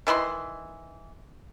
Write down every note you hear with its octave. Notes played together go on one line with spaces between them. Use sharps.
D#3 E3 B5 C6